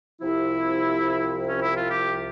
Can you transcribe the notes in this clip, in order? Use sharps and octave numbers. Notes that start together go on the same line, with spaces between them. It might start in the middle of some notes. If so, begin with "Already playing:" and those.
C2 C3 F3 E4
C#4
E4
F4
G4